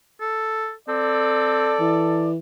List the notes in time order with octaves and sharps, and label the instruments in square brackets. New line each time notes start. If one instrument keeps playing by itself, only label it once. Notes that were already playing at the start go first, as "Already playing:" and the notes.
[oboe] A4
[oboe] C4 [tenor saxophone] A4 [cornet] D5
[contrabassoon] E3